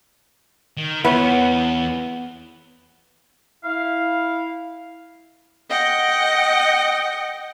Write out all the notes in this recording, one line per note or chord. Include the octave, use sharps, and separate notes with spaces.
D#3
E2 B3 E4 B4 C#5
E4 F5
D#5 F#5 G5